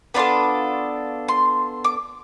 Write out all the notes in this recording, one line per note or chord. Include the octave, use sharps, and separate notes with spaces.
B3 D4 F4 A4 B5
C6
D6